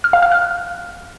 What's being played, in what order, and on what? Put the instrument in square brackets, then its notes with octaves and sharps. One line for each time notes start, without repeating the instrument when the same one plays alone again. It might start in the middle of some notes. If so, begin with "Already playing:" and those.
[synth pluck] F6
F5
F6
F#6